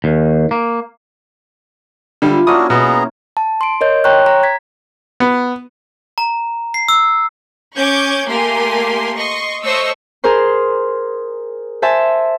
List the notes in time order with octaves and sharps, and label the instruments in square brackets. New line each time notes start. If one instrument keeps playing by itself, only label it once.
[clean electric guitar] D#2
A#3
[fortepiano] D3 G3 [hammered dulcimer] E4 F4 B4
[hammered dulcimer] A#3 C#4 [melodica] D4 E4 F#4 [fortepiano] D#6
[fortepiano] B2 [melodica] B3 G#4 A#5
[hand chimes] A5
C6 D7
A#4 C#5 D#5 G6
C#5 G5 A#5 C6 C#6 F#6
A#5
G#6 B6
[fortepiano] B3
[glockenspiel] A#5
C7
E6
[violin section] C#4 C#6 D6 G6 G#6
A3 A#3 G4 A#4 G#5 C6
D#5 C6 C#6
A3 C5 C#5 D#5 C#6 E6
[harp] G#4 A#4 C5 C6
C5 E5 G#5 A5 E6